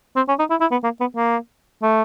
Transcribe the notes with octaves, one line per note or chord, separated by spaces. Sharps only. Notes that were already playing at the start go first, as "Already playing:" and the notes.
C4
C#4
D#4
E4
E4
B3
A#3
B3
A#3
A3